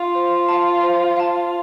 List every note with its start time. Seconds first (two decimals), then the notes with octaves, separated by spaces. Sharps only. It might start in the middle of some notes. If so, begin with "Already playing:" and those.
Already playing: F4
0.15 C5
0.49 F5 A5
0.83 C5
1.17 F5 A5